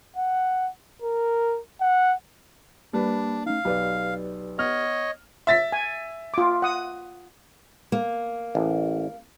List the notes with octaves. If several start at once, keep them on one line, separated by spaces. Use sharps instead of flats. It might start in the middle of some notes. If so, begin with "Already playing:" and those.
F#5
A#4
F#5
G3 A#3 D4 B4
A3 C#4 D#4 F5
B1 G4 B4 D5
B3 C#5 D#5 F6
E5 A6 B6
G#5
F4 D6
F#5 D#6
A#3
A1